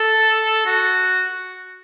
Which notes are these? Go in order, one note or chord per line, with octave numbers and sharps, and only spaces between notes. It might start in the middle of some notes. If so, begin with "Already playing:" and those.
Already playing: A4
F#4